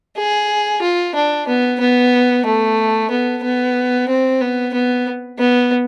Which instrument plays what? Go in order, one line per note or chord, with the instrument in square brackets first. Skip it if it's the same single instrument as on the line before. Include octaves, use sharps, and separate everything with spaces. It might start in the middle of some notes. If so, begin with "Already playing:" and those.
[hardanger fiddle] G#4
F4
D4
B3
B3
A3
B3
B3
C4
B3
B3
B3